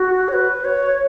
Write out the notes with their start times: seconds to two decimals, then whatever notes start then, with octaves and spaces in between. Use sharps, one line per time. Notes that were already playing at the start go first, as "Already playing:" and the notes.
Already playing: F#4
0.28 C#5
0.33 B4
0.65 C#5